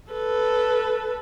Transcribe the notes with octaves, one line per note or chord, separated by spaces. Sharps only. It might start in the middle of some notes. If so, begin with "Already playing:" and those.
A4 B4